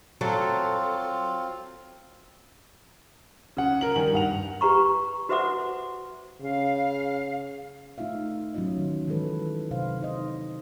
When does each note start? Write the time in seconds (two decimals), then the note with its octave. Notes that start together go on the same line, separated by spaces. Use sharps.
0.21 F#3 C4 F4 A4
3.57 C#3 F#5
3.81 A#4 F#7
3.96 D#3 G3 G#5 F#7
4.14 G2 F#5 F7
4.61 G4 B4 A#5 C#6
5.29 F#4 B4 C5 E5 F#5 D6
6.41 C#3 F5
7.98 A3 D#4 F4 E5 F5
8.54 F#3 C#4 D#4 F4 D#5
8.78 D#3
9.07 D#3 E3 G#3 A4 B4
9.71 C3 F#3 C5 F5
10.01 D#4 C5 D#5